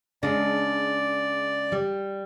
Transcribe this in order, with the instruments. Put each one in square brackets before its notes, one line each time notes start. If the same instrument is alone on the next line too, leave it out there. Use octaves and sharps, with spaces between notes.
[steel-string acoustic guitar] C#3 G#3 [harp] D4 [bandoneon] D5
[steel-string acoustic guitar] G3